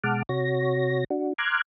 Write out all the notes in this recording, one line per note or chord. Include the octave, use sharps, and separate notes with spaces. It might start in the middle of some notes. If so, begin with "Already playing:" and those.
B2 G#3 F#5 A5 D6 F6
C3 F#4 C#5 A#6
D4 F#4
A#5 C6 D6 F6 F#6 G#6